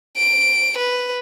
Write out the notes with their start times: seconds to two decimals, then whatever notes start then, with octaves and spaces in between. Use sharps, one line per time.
0.17 D7
0.78 B4